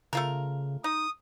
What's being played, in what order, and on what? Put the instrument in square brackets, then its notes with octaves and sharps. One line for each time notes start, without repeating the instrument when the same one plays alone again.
[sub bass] C#3 [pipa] A3 F4 A#4
[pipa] D#4 [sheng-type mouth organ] D#6